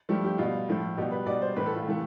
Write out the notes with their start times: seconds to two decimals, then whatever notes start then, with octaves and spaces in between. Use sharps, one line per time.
0.09 G2 F3 A3 G4
0.24 G4
0.38 B2 G3 F4
0.69 A2 F3 A3
0.97 B2 G3 G4
1.12 B4
1.26 B2 G3 D5
1.42 C5
1.56 A2 E3 A3 B4
1.66 A4
1.75 F4
1.86 C3 E3 A3